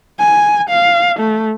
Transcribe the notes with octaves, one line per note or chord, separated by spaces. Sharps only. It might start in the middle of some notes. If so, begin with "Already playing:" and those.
G#5
F5
A3